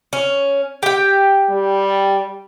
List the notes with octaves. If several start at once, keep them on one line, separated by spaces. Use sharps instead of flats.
C#4
G4 G5
G3